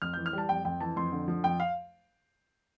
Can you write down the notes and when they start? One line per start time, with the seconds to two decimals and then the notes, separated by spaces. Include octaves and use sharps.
0.02 F2 F6
0.14 E3 G6
0.26 F6
0.33 G3 A5
0.49 F2 G5
0.65 F2 G5
0.80 E3 A5
0.96 F2 C6
1.12 D3
1.28 F3
1.44 F2 G5
1.60 F5